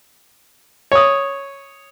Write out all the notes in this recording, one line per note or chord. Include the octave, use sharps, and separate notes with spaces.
C#5 D#6